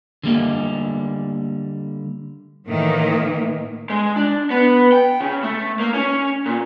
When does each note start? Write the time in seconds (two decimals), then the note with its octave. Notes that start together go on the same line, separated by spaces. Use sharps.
0.23 D3 G3 A#3 D#5
2.67 A2 D#3 E3 A#3
3.90 G#3
4.16 D4
4.51 B3
4.92 G5
5.20 C#3
5.43 A3
5.80 A#3
5.94 C#4
6.46 A#2